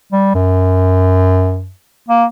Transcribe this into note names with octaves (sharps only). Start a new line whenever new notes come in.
G3
F#2
A#3